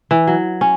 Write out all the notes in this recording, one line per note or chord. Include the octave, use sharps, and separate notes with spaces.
E3
F#3
C#4